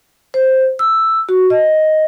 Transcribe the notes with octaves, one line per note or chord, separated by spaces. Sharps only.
C5
E6
F#4
D#5